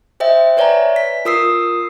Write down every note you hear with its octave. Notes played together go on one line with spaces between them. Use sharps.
C5 D#5 E5 G5
B4 C#5 D5 E5 G#5 A#5
B6
F4 A#4 D#6 E6 C7